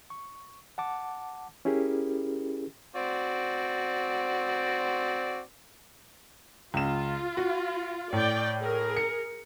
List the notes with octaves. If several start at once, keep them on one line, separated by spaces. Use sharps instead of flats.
C#6
F#5 A5 D6
C#4 E4 G4 G#4 A#4
C4 F#4 D5
C#2 F4 E7
F#4
A2 D5 G5
G#4 A#4
C#7